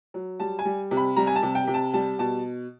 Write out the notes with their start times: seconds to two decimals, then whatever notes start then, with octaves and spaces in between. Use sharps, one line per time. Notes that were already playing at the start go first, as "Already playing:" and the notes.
0.14 F#3
0.40 G3 A5
0.59 G#5
0.65 G3
0.91 C3
0.97 B5
1.16 G3 A#5
1.27 G#5
1.36 A5
1.43 C3
1.55 G5
1.67 C3
1.74 A5
1.94 G3 A5
2.19 B2 A5